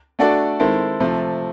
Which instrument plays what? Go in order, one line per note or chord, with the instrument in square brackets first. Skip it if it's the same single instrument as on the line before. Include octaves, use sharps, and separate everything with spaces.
[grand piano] A3 D4 F#4 A4 D5
D#3 G#3 C4 E4 A4
C3 F3 A3